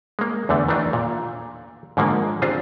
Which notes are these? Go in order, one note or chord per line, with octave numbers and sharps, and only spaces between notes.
G#3 A#3
E2 D3 A3
D#3 E3 A3 D4 D#4
A#2
G#2 D3 D#3 F3 G#3 A#3
C4 D4 F4 G4 G#4 C5